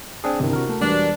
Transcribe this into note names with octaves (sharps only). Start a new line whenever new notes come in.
C4 D4 G#4
G1 C3 D#3 D4 E4
F#4 A#4
A3
E1 G3 D4 B4